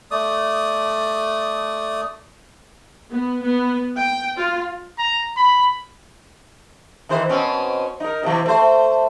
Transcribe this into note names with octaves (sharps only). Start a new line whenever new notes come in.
A3 D5 D#6
B3
B3
G5
F4
A#5
B5
D#3 E3 C5
B2 C4 C#4
D#4 A#4
C3 E3
A3 C5